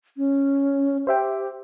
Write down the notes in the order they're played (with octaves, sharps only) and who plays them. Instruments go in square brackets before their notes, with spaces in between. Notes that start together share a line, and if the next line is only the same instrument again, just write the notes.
[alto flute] C#4
[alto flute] G4 [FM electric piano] C5 E5 G5